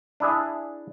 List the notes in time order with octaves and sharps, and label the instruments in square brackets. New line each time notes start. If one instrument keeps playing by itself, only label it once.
[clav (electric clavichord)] D4 E4 G#4